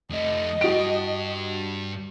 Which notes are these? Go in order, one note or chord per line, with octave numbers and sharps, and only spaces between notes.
F2 A3 D#5
G2 F#4 G4 D7